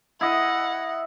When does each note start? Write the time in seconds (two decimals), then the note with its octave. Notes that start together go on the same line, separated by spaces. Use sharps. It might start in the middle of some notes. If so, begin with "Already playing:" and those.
0.21 E4 D#5 F#5